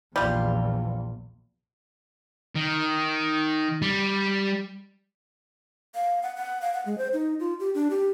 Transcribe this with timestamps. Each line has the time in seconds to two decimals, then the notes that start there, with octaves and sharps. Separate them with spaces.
0.16 A#1 E2 G3 F4
2.55 D#3
3.82 G3
5.94 F5
6.23 F#5
6.37 F#5
6.62 F5
6.74 F#5
6.86 G#3
6.98 C5
7.13 D#4
7.40 F4
7.60 G4
7.75 D4
7.90 G4